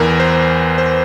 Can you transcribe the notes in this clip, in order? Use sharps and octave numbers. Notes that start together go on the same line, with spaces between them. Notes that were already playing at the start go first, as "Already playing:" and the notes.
Already playing: E2 E3 A#4
C5
C5